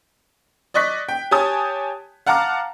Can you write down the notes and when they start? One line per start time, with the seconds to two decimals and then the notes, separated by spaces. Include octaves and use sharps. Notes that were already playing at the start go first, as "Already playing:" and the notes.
0.74 D5 D#5 C#6 F#6 B6
1.09 G5
1.31 G4 C#5 G#5 A5 D#6
2.26 F5 F#5 A5 A#5 D6 F6